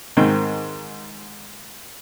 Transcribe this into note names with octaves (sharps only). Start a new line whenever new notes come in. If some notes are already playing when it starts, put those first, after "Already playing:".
G#2 D#3 C4